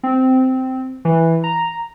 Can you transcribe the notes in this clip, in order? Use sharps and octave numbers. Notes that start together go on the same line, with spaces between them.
C4
E3
A#5